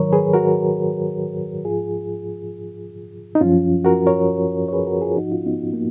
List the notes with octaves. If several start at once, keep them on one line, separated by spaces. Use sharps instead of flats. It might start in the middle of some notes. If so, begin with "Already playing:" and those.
Already playing: G#2 D#3 F#3 A#4 C#5
G#4 B4
F#4 A#4
G#2 F3 F4 G#4
D#4
F#2 F3 C#4 F4
F#4 A#4
A#4 C#5
C#5
G#4 B4
F#4 A#4
F4 G#4
G#2 F3 D#4 F#4
C#4 F4
B3 D#4
A#3